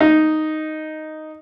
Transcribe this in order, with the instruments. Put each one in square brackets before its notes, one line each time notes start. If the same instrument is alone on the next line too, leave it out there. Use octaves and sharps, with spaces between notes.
[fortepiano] D#4